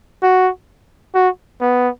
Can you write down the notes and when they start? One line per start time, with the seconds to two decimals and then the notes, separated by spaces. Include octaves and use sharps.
0.22 F#4
1.15 F#4
1.61 B3